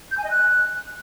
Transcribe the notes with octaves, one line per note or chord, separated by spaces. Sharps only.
G6
G#5
D#5
F#6